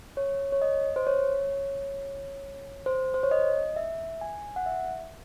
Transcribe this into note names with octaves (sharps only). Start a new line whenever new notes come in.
C#5
C#5
D#5
C5
C#5
C5
C5
C#5
D#5
E5
G#5
F#5
E5